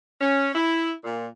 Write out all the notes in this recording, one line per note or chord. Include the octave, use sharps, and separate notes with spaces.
C#4
E4
A#2